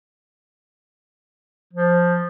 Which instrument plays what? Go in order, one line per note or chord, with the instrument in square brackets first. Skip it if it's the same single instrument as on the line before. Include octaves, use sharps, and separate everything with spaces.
[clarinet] F3